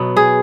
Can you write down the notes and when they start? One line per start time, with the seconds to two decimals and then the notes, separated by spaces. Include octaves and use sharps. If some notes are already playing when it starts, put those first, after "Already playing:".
Already playing: B2 F#3 B3
0.17 G#4